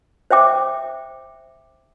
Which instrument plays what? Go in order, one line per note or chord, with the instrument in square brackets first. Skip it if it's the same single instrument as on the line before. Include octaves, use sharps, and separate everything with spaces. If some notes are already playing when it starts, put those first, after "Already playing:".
[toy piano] C5 E5 G5 D6